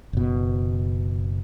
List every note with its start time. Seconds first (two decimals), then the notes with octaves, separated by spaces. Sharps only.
0.13 F#1 B2